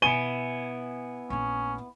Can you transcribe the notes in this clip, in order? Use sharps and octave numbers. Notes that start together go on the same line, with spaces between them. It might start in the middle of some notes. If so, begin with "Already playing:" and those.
B2 B3 E4 F4 G#5 D#7 G7
A#1 A3 C#4